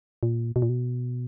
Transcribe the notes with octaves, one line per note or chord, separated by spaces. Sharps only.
A#2
B2
A#2
B2